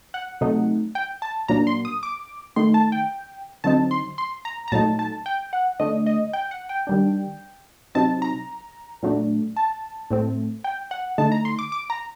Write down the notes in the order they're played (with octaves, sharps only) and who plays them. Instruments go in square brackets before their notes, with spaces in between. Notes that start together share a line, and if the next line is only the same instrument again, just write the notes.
[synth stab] F#5
C3 F#3 A3 D#4
G5
A5
A#2 F#3 A#3 D4 A#5
C6
D#6
D6
D#3 A3 D#4 C6
A5
G5
D3 F#3 C4 D#4 A5
C6
C6
A#5
A#5
A#2 F#3 A3 D#4 A5
A5
G5
F#5
D3 A3 D4 D#5
D#5
G5
F#5
G5
D#3 G3 D4
C3 F#3 C4 D#4 A5
A#5
A#2 F#3 A3 D4
A5
A2 A3 C4
G5
F#5
D3 A3 D#4 A5
A#5
C6
D6
D6
A#5